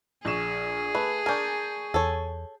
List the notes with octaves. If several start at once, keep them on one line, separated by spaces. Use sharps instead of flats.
A#1 G#4 C#6 E7
A3 B4
D4 A#4 G#5 C#6 G6
E2 A4 C#5